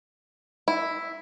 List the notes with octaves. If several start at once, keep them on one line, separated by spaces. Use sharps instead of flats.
E4